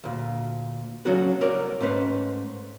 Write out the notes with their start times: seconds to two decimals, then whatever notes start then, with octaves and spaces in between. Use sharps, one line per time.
0.04 D2 A#2
1.05 C#3 F#3 C#4 D4 F#4 A4
1.41 C2 A#4 C#5 D5
1.80 G#2 A3 C#4 B4 C5